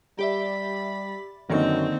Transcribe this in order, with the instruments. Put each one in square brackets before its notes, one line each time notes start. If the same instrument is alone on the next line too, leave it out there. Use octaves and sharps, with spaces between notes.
[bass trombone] G3 [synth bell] G4 D5 E5 [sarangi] B5
[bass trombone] F#2 [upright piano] D3 D#3 D#4 [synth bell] A#3 C#6 [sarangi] C4